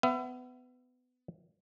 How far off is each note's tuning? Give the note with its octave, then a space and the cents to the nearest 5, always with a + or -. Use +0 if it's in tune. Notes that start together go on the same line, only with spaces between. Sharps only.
B3 +25 E5 +30